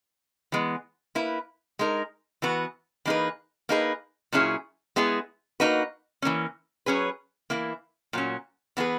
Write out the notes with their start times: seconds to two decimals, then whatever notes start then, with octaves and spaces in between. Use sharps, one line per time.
0.52 E3 G#3 B3
1.15 A#3 E4 B4
1.79 G#3 D#4 A#4
2.42 E3 B3 F#4 B4
3.05 E3 A#3 D#4 G#4 B4
3.69 A#3 D#4 G#4 B4
4.32 A#2 F#3 C#4 E4 G#4
4.96 G#3 B3 E4 G#4
5.60 A#3 D#4 F#4 B4
6.22 E3 A#3 C#4
6.86 F#3 C#4 G#4 B4
7.50 E3 A#3 E4
8.13 A#2 F#3 C#4
8.77 E3 B3 D#4 G#4 B4